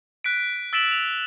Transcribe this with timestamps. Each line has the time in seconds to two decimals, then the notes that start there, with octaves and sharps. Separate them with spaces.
0.24 F#6 B6 D7
0.73 E6 A6 B6 D7 E7 F#7
0.91 F7